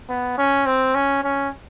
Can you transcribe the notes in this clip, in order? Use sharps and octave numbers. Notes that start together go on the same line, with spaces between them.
B3
C#4
C4
C#4
C#4